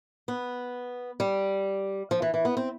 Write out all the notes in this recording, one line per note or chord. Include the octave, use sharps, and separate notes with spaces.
B3
G3
F3
E3
E3
B3
C4